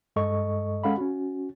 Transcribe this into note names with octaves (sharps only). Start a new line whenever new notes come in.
G2 G#3 A4 D#5 C#6
G#3 C#4 A4 F5 F#5 B5
C#4 F#4